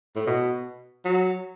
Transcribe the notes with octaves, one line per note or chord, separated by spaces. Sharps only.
A2
B2
F#3